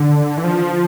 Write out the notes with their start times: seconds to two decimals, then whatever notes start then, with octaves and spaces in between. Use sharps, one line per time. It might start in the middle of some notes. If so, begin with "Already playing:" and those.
Already playing: D3
0.37 E3
0.44 F3